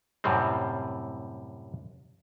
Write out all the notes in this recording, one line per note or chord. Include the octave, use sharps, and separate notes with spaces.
F#2 A2 C3 G3 C4